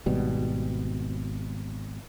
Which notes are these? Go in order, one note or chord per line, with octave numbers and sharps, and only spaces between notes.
G#1 B2 G3